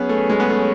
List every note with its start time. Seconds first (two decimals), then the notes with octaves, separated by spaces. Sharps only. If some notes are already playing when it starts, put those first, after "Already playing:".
Already playing: F#3 B3 C#4 G#4 B4
0.09 A3
0.30 G#3
0.40 B3
0.49 A3